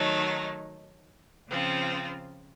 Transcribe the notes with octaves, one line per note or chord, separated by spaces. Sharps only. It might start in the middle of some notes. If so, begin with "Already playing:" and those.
Already playing: D#3 F#3 A3 D#4
C#3 F3 C4 F4